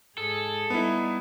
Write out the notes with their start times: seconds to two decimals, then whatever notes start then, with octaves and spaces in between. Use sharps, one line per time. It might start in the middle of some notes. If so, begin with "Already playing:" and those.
0.18 G#2 G#4 A4
0.70 G3 B3 D#4 E4